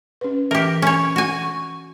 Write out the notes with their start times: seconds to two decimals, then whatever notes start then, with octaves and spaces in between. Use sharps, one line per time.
0.21 C#4 B4
0.51 E3 G4 A#4
0.82 C#4 C#5
1.16 F#4 G#5
1.42 C#6